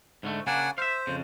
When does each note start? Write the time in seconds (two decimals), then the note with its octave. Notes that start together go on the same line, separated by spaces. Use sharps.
0.23 G#2 D3 A3
0.47 C#3 A#3 D4 F#5 G#5
0.78 C5 E5 F5
1.07 F2 C#3